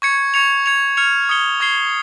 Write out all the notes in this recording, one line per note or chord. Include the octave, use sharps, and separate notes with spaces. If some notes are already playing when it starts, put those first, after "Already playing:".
C#6 G#6 C#7
C#6 G#6 C#7 F7
G#6 C#7 F7
F6 G#6 C#7 F7
D#6 G#6 C#7 G7
C#6 G#6 C7 G7